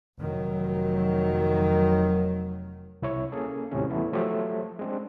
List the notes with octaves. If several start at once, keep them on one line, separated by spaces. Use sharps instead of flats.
F1 D#3 F#3
C2 E4 C#5
A#3 C#4 G#4 A4
D#2 A2 C3 G#3 C#4
E3 G3 A3 B3 E4
F3 F#3 A3 G4 C5 C#5
G#3 C4 D4